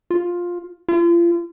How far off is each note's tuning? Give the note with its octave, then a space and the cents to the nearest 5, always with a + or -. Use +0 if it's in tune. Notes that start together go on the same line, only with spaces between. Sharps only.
F4 +10
F4 -35